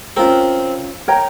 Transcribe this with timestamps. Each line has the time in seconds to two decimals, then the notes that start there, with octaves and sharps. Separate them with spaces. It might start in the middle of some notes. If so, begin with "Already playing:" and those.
0.16 C4 C#4 F4 A#4
1.08 A#4 C#5 G5 A#5